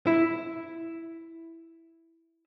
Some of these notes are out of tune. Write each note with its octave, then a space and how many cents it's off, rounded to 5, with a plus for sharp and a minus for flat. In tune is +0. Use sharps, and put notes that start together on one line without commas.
E4 +0